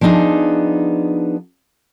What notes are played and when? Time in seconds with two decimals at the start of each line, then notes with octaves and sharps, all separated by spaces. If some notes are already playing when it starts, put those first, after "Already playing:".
0.01 F3 B3 D4 D#4 G#4